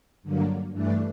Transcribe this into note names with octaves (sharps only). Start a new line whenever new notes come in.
G2 D3 F#3 A#3
G2 E3 A3 D4